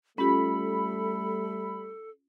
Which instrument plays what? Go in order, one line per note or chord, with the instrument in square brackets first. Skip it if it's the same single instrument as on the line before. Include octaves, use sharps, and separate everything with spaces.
[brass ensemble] G3 A3 [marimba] C#4 F4 G4 [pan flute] A4 [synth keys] B5